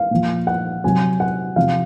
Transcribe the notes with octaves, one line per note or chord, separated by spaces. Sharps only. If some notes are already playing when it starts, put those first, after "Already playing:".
Already playing: F5
A#2 F3
F#5
C3 F#3 G#5
F#5
C3 F3 F5